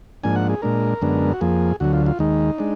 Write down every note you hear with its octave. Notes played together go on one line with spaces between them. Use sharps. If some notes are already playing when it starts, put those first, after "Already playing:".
G#2 F3 A#3 D4 G#5
F#5
G#4
A#2 G#3 D4 A#4
F#2 D3 G#3 B3 D4
F#4
F2 F3 A#3 G#4
D2 D3 F#3 F#4
F4
F4
D#2 D#3 G#3 D#4
G#3 D4